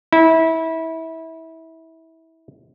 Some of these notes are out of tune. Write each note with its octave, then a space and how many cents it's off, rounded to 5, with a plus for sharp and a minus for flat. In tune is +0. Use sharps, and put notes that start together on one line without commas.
E4 -25